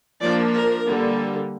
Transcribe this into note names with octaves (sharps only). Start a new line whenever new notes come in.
F3 A#3 D4 D5
A#4
D3 G3 A#3